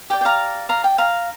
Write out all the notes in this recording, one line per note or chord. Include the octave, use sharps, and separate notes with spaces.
G4 D5 G5
G5
F5 A#5
F5 A#5
G5
F5 A#5